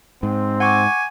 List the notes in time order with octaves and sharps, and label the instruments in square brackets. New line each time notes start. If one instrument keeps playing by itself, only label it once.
[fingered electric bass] G#2 [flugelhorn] C4
[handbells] F#5 C#6 D6 [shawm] G#5